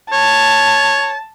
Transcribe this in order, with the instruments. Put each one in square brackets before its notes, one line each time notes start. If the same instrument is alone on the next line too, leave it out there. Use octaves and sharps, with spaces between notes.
[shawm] C#5 [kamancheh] A5